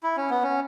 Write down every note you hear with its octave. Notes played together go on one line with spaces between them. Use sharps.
E4
C#4
B3
C#4